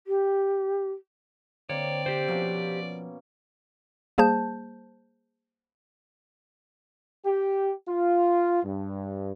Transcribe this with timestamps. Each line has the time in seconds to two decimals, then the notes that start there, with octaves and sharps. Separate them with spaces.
0.07 G4
1.70 D3 A#3 C4 C#5 D5
2.06 G4 C5
2.28 B2 F3 A#3 C#4
4.18 G3 A#3 G#4 C5 A5 G6
7.25 G4
7.87 F4
8.64 G2